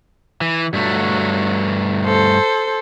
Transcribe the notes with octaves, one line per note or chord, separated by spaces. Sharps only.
E3
G2 F#3 A3
A4 C5